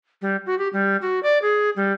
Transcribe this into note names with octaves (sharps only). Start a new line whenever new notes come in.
G3
F#4
G4
G3
F#4
D5
G#4
G3